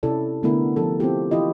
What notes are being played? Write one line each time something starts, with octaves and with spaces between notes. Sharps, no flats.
C3 C#4 E4 A4 D5
D3 A3 B3 D4 E4 A#4
F3 G4 A4 A#4
C4 E4 F4 G4
E3 E4 F4 G4 D#5